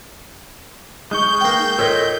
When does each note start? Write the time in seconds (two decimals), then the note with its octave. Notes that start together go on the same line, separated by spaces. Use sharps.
1.11 G#3 D#4 C#6 G6
1.41 A#3 G5
1.79 A#2 A4 C#5 D#5